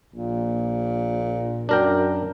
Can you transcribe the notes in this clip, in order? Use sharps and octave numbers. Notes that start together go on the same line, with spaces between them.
A#1 A#2
F#2 D4 A#4 G5